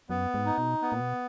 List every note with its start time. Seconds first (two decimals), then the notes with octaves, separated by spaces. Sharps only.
0.09 F#2 B3
0.34 G#2
0.46 D#4
0.58 B2
0.82 B3
0.92 A#2
1.01 B2